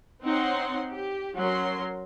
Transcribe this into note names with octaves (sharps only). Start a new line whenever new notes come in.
C4 D#4 C5 C#5 F#5 C6
G4
F#3 C#4 A#4 C6